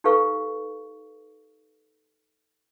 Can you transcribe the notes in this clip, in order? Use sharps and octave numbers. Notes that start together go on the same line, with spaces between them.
D#4 G4 A4 B4 F5 C#6